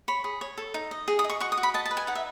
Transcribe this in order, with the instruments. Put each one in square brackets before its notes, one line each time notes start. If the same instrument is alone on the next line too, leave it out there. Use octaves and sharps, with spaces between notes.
[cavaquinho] C#5 B5
G#4
C#5
A4
D#4
D#5
G#4
D#6
D#5
C#6
F#4 C#6
D#6
F#4
B5
D#5 A5
A5
B4
G#5
D#4 F#5
E5